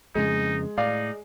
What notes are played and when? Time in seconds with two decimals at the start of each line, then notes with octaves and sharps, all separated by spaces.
0.15 F2 C#3 G#3 D#4
0.78 A2 D#4 D5 F5